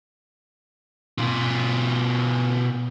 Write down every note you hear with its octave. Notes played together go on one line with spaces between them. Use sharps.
B2 F4